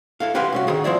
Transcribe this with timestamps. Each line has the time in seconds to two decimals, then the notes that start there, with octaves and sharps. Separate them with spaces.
0.20 E4 A4 F5
0.35 G4 B4 C5 F5 F#5
0.52 C2 C#4 F#4
0.67 D#3 G#4
0.84 F3 C4 E4 D5